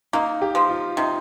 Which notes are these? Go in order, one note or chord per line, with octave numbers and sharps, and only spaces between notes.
A#3 D#4
G4
F3
F4
C3 D#4